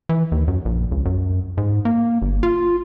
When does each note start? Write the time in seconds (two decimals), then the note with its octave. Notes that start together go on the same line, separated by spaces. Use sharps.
0.09 E3
0.32 D#2
0.48 F#2
0.65 A#1
0.92 C#2
1.05 F#2
1.57 G#2
1.85 A#3
2.22 G1
2.43 F4